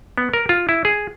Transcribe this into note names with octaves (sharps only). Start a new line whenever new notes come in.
B3
A#4
F4
E4
G#4